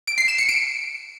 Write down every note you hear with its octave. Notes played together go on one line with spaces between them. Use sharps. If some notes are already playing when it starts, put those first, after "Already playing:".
D7
C7
E7
C#7
D7